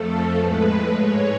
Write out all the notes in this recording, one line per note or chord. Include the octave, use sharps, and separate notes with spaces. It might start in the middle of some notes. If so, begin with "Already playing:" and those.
Already playing: F2 F3 A3 A4
A2 G#3 B4
G#2 G#3 C#5